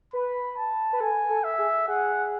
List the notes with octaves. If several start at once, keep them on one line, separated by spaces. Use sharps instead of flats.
B4 B5
A5
B4
A4 G#5
A4
E5
G#4
G#4 F#5